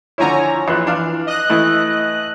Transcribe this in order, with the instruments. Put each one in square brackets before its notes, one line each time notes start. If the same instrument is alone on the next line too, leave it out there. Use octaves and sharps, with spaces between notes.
[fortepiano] D3 F3 E4 [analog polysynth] C#5 G#5 A#5
[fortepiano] A#1 F4 F#6 [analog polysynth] E3
[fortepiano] D4 F5
[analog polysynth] D#5 F#6
[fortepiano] E3 A3 E4